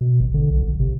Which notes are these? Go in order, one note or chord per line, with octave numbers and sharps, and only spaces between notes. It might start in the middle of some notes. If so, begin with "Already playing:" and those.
B2
G#1
D3
B1
G#1
C3